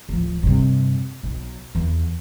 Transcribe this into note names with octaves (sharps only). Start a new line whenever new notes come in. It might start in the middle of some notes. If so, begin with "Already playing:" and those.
D1 F3
G2 C3
B1
E2